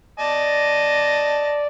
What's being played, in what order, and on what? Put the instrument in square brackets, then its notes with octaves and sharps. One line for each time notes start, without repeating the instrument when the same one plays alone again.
[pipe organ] D5 [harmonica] D#5 A5